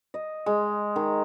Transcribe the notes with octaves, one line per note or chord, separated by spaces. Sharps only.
D#5
G#3
D#3